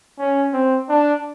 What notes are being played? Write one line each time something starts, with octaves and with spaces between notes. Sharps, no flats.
C#4
C4
D4